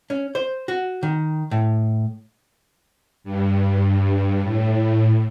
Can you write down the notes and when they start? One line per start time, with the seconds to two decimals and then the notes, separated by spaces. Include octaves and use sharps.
0.10 C#4
0.35 C5
0.68 F#4
1.03 D#3
1.51 A2
3.24 G2
4.42 A2